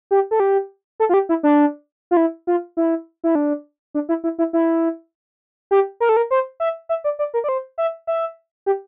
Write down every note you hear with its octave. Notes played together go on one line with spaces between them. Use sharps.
G4
A4
G4
A4
F4
G4
E4
D4
F4
E4
F4
E4
E4
D4
D4
E4
E4
E4
E4
G4
A#4
A4
A#4
C5
E5
E5
D5
D5
A#4
D5
C5
E5
E5
G4